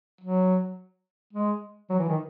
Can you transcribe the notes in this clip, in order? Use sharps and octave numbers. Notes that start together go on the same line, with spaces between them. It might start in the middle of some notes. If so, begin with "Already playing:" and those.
F#3
G#3
F#3
E3
D#3